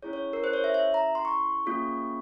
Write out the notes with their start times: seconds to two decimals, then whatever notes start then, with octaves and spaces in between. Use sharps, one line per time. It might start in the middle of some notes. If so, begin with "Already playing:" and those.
0.03 C#4 E4 G#4 C#5
0.13 C#5
0.33 A#4
0.44 C5
0.53 C#5
0.64 E5
0.74 E5
0.94 A#5
1.15 C6
1.25 C#6
1.66 A#3 C#4 F4 G#4